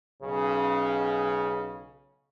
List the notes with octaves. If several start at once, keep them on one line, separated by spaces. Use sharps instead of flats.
B1 C#3